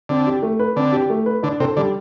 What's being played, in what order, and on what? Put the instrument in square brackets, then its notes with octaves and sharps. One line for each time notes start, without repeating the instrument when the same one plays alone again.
[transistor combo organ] D3 [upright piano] C4
[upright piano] G4
A3
B4
[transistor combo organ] D3 [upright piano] C4
[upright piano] G4
A3
B4
[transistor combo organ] D3 [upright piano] D4
[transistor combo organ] C3 [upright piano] A4
[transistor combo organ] D3 [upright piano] G3